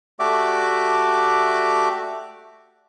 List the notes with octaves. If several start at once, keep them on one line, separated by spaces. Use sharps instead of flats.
A3 F#4 G4 D5 E5 D6